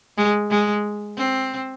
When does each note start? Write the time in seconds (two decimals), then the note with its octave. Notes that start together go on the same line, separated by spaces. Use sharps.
0.17 G#3
0.50 G#3
1.17 C4